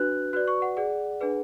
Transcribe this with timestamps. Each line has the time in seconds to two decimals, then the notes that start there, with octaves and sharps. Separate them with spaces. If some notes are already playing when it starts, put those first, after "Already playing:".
Already playing: D4 F#4 B4 F#6
0.33 F#4 B4 D5 F#6
0.48 C#6
0.62 F#5
0.77 G#4 D5 F#5
1.21 D4 G#4 B4